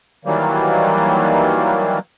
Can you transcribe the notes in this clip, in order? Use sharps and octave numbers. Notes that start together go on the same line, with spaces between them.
D#3 E3 F#3 G3 A#3